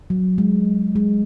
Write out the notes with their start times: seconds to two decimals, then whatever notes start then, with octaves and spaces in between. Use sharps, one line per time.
0.10 F#3
0.38 G#3
0.96 G#3